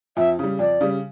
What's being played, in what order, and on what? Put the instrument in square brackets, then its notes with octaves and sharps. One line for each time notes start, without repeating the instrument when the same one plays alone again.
[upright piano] F2 [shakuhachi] E5
[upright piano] C#3 G3
[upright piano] F2 [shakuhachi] D5
[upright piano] C#3 G3